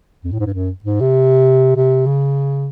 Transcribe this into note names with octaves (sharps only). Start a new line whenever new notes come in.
F2
A2
G#2
G2
F#2
G#2
C3
C3
C#3